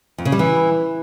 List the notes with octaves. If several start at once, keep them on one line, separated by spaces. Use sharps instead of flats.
F2
C#3
G3
E3